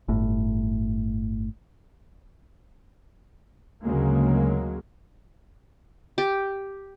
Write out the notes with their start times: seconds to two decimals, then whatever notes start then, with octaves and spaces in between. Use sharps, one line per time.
0.08 G1 A2
3.83 D2 C#3 F#3 G#3 A#3
6.18 G4